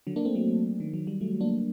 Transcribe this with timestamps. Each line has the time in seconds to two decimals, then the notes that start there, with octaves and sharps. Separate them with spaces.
0.07 D3 F#3
0.16 A#3 D4
0.25 A3 C4
0.35 F#3 A3
0.80 D#3
0.94 F#3
1.07 G3
1.21 F#3 A3
1.40 A#3 D4